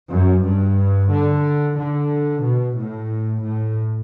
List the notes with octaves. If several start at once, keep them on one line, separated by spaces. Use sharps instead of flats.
F#2
G2
D3
D3
B2
A2
A2